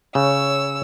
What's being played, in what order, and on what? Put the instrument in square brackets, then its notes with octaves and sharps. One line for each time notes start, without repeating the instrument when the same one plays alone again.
[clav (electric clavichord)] C#3 [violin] C#5 E6